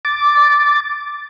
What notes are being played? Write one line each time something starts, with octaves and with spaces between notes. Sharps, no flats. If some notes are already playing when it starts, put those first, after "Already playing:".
D6 A6